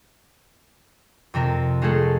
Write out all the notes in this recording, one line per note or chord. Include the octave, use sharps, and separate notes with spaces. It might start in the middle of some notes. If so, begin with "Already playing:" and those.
F2 C3 C4 A#4
G#3 A3 F4 G#4 A4